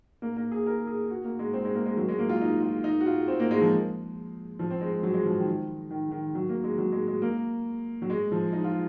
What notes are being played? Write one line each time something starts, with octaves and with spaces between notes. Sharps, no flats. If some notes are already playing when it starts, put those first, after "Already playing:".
A#3
A#3
G#4
A#4
G#4
F#4
A#3
G#3
C4
G#3
A#3
G#3
F#3
G#3
A#3
F4
D#4
F4
D#4
F#4
F4
C4
A#3
G#3
F3
F3
C4
G#3
F#3
G#3
F3
D#3
D#3
D#3
F#3
A#3
G#3
F#3
G#3
G#3
A#3
F#3
G#3
F3
D#4
F4